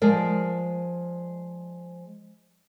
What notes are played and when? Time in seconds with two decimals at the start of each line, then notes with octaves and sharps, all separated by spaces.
0.02 F3 G#3 A#4 D5